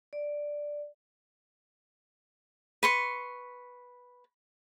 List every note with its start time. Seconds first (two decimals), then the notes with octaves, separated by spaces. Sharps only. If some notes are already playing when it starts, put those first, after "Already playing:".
0.13 D5
2.83 B4 C6 C#6